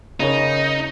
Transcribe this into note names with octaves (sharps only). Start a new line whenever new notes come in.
C#3 C#4 D#4 A#4